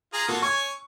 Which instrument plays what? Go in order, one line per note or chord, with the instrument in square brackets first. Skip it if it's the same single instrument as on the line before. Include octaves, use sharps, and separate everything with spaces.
[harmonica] F4 G#4 A#5
[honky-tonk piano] A#2 [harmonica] F4 F#4 A4
[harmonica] C#5 G#5 [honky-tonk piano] C#6